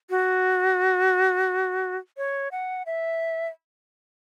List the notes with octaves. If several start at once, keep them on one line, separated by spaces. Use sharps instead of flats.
F#4
C#5
F#5
E5